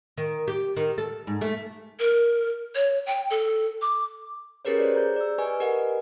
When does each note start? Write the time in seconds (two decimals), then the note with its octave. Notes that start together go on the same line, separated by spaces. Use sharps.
0.17 D#3
0.48 G4
0.76 D#3
0.98 A4
1.27 G#2
1.41 A3
1.99 A#4
2.75 C#5
3.06 G5
3.30 A4
3.82 D6
4.65 C#4 G4 G#4 A#4 B4 C#5
4.79 F#4 C5 D5
4.94 G#4 A#5 G6
5.16 D5 E6
5.38 G4 B4 D#5 G#5 C#6
5.60 G4 A#4 B4 D#5 F#5 G#5